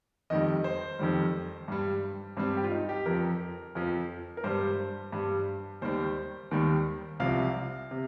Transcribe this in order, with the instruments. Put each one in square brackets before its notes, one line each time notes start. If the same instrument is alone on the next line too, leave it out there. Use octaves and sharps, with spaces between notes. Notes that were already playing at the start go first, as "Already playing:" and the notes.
[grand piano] F2 D#3 G3 D#5
C5
F2 D#3 G3
G2 G3
G2 G3 C4
G4
F4
D#4
G4
F2 F3 A#4
F2 F3
A#4
G2 G3 C5
G2 G3
D#2 D#3 G3 C5
D#2 D#3 G3
C2 C3 F3 F5
C3